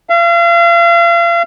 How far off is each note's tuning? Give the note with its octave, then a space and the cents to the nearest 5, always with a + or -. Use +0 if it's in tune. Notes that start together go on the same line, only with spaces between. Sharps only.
F5 -40